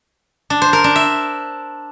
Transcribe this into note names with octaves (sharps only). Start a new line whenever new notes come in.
D4
C5
A#4
D4
E5